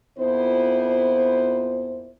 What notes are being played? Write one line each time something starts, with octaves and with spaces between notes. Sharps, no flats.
F2 A#2 B3 E4 C5